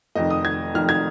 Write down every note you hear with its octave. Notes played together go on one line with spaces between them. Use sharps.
F1 F2 D#3 D#5
D#6
G#6
F1 F2 D#3 F6
G#6